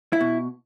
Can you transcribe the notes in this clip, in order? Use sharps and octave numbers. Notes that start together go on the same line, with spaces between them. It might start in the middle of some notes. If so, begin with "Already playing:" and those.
E4
B2